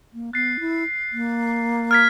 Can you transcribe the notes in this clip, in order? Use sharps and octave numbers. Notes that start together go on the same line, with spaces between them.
A#3
B3 F#6 A6 C7
E4
A#3
F6 G#6 B6